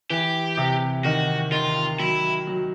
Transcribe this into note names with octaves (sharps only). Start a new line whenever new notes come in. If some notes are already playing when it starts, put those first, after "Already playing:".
E3 G4
C3
D#3 F#4
D#3 F4
F#3 E4
F#3